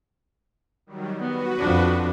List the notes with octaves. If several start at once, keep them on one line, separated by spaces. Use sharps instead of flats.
D#3 F#3 G3
B3 F#4 B4
F2 F3 D4